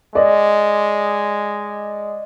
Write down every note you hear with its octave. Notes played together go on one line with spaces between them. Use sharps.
G#3 D5 D#5